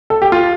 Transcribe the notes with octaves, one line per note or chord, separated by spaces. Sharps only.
A4
G4
F4